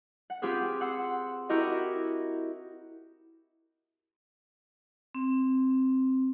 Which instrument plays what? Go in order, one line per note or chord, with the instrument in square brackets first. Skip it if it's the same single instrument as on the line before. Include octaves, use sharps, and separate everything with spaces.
[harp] F#5
C4 F4 G4 G#4 B4
F#5 C6 E6
E4 F#4 G4 A#4 D#5
[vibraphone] C4